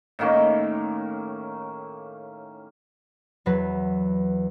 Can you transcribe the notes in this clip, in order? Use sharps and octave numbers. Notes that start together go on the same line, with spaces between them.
A2 D#3 A#3 C#4
E2 F#3 B4